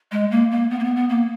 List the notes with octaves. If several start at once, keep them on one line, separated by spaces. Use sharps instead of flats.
G#3
A#3
A#3
B3
A#3
B3
B3
A#3